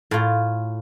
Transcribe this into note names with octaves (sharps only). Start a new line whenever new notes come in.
A2 F4